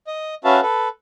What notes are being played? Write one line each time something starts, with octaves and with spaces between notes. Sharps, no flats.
D#5
C#4 F#4 B4 E5 F5 A5
A4 B4